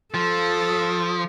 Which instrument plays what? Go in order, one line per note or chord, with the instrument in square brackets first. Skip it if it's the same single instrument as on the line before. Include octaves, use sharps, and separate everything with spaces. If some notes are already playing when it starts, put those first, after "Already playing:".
[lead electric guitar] F3 [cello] A4